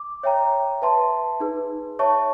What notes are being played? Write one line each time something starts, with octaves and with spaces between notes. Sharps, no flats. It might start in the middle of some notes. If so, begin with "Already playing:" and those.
Already playing: D6
C#5 E5 G5 A#5
B4 E5 A5 C6
D#4 G#4 B4
C#5 E5 A5 C#6